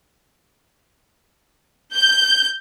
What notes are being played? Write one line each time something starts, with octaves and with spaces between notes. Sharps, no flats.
G6